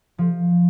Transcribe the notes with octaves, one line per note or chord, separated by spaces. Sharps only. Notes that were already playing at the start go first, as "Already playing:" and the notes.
F3